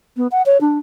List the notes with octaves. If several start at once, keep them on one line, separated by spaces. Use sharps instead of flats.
B3
F#5
C#5
D4